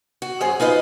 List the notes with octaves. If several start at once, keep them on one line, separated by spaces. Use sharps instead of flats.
F#4
F#2 G#4 C5
D#4 F4 B4 D#5